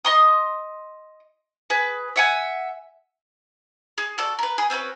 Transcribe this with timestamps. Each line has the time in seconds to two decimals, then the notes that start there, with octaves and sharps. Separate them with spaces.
0.05 D#5 C6 D#6
1.70 G#4 B4
2.16 E5 F#5 G#5
3.98 G#4
4.18 F#4 A4 D5
4.39 A#4 B4
4.58 G#4
4.70 C4 C#4 F#4 B4